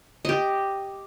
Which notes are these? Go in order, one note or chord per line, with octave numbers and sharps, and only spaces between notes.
G4 D#5